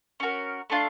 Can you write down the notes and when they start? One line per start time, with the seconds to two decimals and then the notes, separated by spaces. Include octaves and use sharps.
0.20 C#4 F#4 A#4
0.70 A3 D4 F4